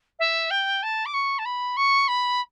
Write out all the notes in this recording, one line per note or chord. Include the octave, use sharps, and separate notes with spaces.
E5
G5
A5
D6
C#6
A5
B5
C#6
B5